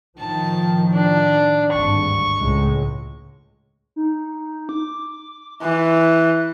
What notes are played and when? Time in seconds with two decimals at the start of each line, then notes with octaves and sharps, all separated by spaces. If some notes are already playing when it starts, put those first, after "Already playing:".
0.19 A2 D#3 F3 A5
0.94 D4
1.73 G#1 D2 G2 C#6
2.38 C#2 A2 G#3
3.96 D#4
4.69 D6
5.62 E3 F#6